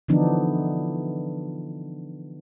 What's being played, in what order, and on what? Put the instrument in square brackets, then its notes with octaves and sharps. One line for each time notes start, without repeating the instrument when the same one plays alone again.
[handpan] D3 E3 F3 B3 D4 D#4